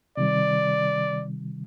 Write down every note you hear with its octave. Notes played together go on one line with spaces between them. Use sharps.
C3 D#3 G3 D5